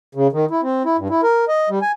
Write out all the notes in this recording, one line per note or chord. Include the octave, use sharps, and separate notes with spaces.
C#3
D#3
E4
C4
E4
G2
E4
A#4
D#5
G3
G#5